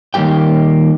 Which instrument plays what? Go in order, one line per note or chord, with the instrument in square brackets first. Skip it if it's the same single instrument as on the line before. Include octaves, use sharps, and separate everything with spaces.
[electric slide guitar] D#3 G3 A#3 G4 G5